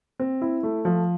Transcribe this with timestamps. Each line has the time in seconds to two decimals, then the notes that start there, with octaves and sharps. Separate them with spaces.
0.20 C4
0.42 E4
0.63 A3
0.85 F3